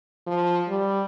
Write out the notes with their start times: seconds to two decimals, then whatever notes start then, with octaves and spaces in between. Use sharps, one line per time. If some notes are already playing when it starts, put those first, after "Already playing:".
0.26 F3
0.68 G3